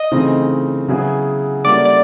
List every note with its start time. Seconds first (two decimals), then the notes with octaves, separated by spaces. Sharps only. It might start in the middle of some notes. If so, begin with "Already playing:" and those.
Already playing: D#5
0.12 C#3 E3 A3 C4 D#4
0.88 C#3 F#3 B3 E4 G#4
1.65 D3 G3 A#3 C#4 E4 D5
1.85 D5